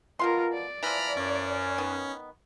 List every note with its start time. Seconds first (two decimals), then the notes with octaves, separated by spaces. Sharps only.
0.19 B2 F4 A#4 F5 C6
0.54 D5
0.83 E3 F3 A#5 B5 F6
1.17 F#2 C#4
1.78 D#3 B3